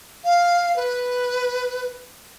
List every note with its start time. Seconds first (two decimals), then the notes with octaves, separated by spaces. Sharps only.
0.24 F5
0.76 B4